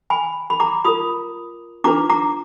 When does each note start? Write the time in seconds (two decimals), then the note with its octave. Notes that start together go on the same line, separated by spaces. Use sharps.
0.10 G#5 B5
0.50 B5
0.60 A#5 D6
0.84 F4 A#4 B5 D#6
1.84 D4 F4 B4 A#5 D6
2.09 A#5 D6